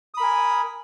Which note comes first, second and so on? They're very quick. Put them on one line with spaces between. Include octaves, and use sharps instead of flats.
D#6 B5 A#4 G#5